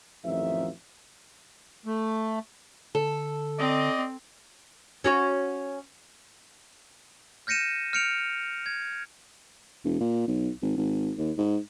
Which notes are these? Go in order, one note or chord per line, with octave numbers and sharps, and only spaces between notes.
A1 F2 D#3 F4 E5
A3
D3 A4
C4 D5 D#5
C#4 F#4 C#5
F6 G6 A#6 C#7 D#7 E7
F6 G6 C#7 D7 F7
G#6
E1
A#2
B1
G#1
G#1
D#2
G#2